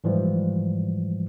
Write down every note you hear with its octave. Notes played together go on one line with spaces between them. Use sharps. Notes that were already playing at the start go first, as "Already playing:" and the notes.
G#2 E3 F3 G3 G#3